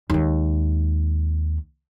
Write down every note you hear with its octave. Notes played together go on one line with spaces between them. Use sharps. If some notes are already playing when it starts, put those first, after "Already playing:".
D#2 G#3